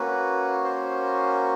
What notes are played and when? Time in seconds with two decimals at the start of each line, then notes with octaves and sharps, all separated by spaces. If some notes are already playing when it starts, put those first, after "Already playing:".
Already playing: A#3 C#4 F#4 B4
0.64 C5